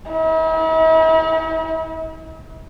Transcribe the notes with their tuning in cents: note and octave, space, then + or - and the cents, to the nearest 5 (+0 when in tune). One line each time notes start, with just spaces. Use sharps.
E4 -45